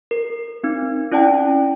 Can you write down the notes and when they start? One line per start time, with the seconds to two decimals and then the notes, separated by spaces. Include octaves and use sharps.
0.11 A#4
0.63 C4 D#4
1.12 C#4 E4 D5 F#5 G5 A5